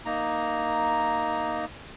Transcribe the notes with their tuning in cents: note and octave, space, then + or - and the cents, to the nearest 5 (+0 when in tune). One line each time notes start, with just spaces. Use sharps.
A#3 +0 D#4 +0 A#5 +0